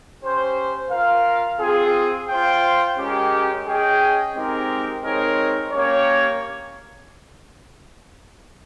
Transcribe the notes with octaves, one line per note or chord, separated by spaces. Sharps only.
C#4 G4 C5
F4 A#4 F5
C4 F4 G#4
F4 C5 G5
G#3 C#4 G4 A#4
C#4 G#4 D#5 G5
G#3 C4 D#4 G4 A#4
G#3 C4 D#4 A#4 C#5
A#3 C#4 G4 C#5